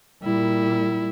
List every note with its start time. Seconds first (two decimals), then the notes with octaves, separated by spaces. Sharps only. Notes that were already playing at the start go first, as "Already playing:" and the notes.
0.24 A#2 G3 E4